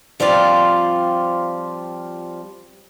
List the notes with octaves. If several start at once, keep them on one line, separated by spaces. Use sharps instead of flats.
F3 G3 C4 F4 D5